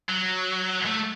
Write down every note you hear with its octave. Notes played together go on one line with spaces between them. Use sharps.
F#3
A3